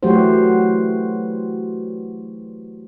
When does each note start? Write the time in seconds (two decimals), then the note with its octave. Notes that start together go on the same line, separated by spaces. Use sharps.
0.03 E3 F#3 A3 F#4 G4 C5